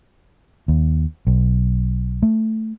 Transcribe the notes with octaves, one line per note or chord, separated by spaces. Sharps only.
D#2
B1
A3